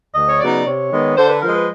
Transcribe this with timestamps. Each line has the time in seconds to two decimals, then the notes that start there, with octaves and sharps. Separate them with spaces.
0.14 D2 D#5
0.28 C#5
0.40 C#3 F#3 B3 D#4 D5
0.65 C3 C#5
0.91 D#3 G#3 B3
1.17 D3 C5
1.29 B4
1.42 F3 G#3 A#4
1.55 B4